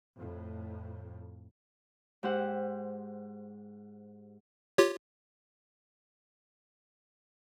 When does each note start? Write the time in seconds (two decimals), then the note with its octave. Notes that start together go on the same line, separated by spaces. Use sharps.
0.16 F2 A2
2.23 G#2 G4 C5 F#5
4.78 F4 G4 C#5